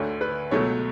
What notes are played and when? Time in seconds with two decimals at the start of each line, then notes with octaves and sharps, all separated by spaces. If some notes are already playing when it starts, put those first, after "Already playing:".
Already playing: D2 D3 A3 C#5
0.21 B4
0.51 C#2 B2 F#3 A3 C#5